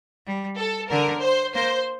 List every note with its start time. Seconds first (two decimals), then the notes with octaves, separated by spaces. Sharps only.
0.26 G3
0.58 A4
0.90 D3 A#4
1.22 C5
1.54 A#3 C5